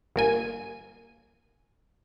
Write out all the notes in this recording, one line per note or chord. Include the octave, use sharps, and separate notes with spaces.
G1 A#3 G#5